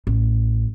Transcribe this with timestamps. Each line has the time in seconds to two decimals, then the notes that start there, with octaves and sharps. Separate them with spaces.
0.07 A1